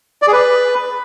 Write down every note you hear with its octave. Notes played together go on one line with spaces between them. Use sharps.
D5
G#4
B4